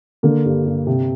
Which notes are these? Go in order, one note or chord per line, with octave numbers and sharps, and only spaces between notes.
D3 A#3
G2
G2
C3